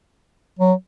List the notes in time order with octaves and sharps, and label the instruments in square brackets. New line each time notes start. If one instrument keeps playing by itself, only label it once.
[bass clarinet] F#3